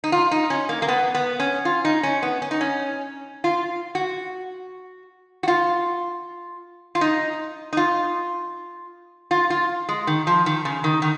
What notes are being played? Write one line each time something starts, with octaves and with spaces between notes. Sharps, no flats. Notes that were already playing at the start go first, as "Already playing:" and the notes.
D#4
F4
D#4
C#4
A#3
A#3
B3
B3
C#4
F4
D#4
C#4
B3
C#4
D#4
C#4
F4
F#4
F#4
F4
F4
D#4
D#4
F4
F4
F4
G#3
D#3
F3
D#3
C#3
D#3
D#3